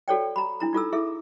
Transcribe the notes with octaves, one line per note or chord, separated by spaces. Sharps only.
F#4 A4 C#5 D5 G5
A#5 B5
D4 E4 A#5
D#4 F4 A4 E6
E4 G#4 A4 E5